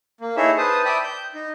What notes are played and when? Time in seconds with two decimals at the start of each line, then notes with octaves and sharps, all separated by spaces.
0.21 A#3
0.37 D#4 E4 G#4 A4 C#5 E5
0.58 B4 C5 A5 D#6
0.85 D5 E5 G5 A5 B5 D#6
1.03 G6
1.35 D#4